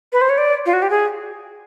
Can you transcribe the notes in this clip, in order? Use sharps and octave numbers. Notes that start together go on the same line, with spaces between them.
B4
C5
C#5
D5
F4
F#4
G4
G#4